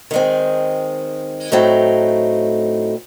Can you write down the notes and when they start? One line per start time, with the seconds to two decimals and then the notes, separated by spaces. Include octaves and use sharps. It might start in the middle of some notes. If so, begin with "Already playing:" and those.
0.11 D#3 G#3 C4
1.52 A2 F#3 A3 C4 D#4